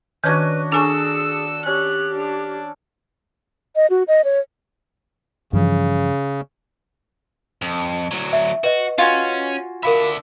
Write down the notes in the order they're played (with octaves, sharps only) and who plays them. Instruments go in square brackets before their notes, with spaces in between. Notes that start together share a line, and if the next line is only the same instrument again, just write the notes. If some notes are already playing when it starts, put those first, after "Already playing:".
[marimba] D#3 G#6 [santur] C#4 D4 F#4 [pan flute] B4
[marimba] D4 G#5 C#6 [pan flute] G#4 [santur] A4 D5 [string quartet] E6
[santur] C#4 [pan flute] G4 [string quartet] F#6
[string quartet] D4
[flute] D#5
F#4
D#5
C#5
[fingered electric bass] G2 E3 F3 [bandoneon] C#3
[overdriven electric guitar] F2
D2 F#3
[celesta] E5
[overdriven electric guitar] F#4 [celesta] B4 D#5
[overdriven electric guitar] C#4 [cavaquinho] F4 F#4 G#5
[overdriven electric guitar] D3 E5 [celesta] A#4 F5 B5